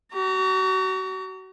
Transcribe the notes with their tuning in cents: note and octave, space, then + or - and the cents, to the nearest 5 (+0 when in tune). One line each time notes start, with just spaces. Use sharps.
F#4 +35 A#5 -30